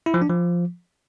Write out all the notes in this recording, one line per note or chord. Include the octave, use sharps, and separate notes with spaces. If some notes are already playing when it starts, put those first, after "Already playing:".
E4
F3
D4
F3